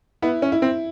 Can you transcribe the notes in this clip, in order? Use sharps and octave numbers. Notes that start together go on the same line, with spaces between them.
B3 E4
C#4
E4
C4